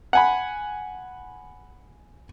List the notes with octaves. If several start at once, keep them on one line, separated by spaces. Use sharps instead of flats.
F#5 G#5 B5